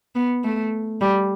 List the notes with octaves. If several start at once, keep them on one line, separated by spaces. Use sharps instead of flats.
B3
A3
G3